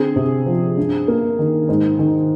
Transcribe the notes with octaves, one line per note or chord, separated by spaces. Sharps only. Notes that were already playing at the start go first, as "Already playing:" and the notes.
Already playing: D3 C4 G#4
C3
F3
G2
A#3
D#3
G#2
D#3